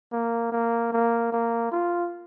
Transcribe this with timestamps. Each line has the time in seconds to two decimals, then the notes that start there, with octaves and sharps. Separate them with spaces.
0.12 A#3
0.52 A#3
0.92 A#3
1.32 A#3
1.72 F4